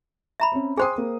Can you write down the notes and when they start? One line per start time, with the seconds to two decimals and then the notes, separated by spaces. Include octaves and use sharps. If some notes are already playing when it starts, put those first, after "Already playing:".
0.40 E5 A#5 B5
0.52 C4 C#4
0.77 G#4 C5 G5 G#5 C6 D#6
0.98 A#3